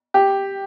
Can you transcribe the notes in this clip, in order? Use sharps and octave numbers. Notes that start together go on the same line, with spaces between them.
G4